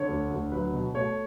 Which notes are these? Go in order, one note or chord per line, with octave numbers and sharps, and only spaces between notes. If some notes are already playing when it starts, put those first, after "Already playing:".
Already playing: D3 C#5
D2
D2
F#3 B4
B2
A3 C#5